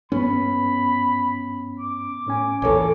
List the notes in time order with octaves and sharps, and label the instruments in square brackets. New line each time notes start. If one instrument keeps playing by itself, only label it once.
[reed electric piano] G2 C#4 [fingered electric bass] B3 [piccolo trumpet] B5
[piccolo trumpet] D6
[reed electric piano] A2 C#4 G#5
[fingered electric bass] A#1 E2 [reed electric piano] A4 C#5 G#5 [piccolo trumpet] D6